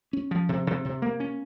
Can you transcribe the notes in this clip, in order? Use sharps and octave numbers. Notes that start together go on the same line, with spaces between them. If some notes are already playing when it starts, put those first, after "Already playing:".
C#4
F3
C3
C3
C3
A#3
C#4